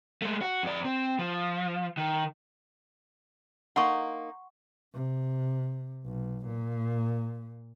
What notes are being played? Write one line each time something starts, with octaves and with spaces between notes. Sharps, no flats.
G#3 A3
F#4
F2 D5
C4
F3
D#3
A#3 D#4 F#5 C6 C#6
C3
B1
A#2